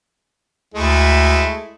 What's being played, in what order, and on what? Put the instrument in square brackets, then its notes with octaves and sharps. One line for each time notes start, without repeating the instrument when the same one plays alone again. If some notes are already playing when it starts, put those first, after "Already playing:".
[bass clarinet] D2 [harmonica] G#3 A3 E4